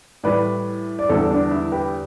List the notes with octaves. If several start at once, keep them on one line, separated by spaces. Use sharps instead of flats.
A2 E3 G3 B4 D5
D5
E2 D3 G3 A4 C5
D4
E4
G4 B4